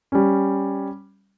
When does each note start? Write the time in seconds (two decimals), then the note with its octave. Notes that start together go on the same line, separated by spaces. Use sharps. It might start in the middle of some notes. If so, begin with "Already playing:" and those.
0.12 G3 C#4